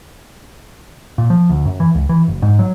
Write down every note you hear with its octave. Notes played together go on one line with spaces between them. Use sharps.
A#2
F3
D2
F#2
E3
C#2
E3
F#1
G#2
F#3